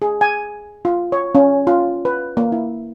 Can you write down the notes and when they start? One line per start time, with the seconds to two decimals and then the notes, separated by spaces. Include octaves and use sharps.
0.02 G#4
0.21 G#5
0.85 F4
1.12 C#5
1.35 C#4
1.67 F4
2.05 B4
2.37 A#3
2.52 E4